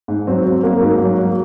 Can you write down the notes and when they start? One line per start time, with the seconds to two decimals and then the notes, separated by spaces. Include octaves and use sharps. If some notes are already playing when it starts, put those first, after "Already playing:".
0.08 G#2
0.27 F#3 C4
0.46 F#3
0.63 F#3 A#3
0.82 G#2
1.01 F#3
1.19 F#3